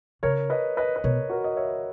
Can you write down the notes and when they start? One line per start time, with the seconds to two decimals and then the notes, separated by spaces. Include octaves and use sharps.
0.23 C#3 A#4 C#5
0.50 B4 D#5
0.77 B4 D#5
0.96 B4
1.04 B2 A#4 C#5
1.30 F#4 A#4
1.44 D#5
1.57 C#5 E5